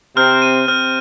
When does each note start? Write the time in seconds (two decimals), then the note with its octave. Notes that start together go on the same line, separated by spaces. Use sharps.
0.16 C3 C4 F6
0.42 D#7
0.68 C3 C4 F6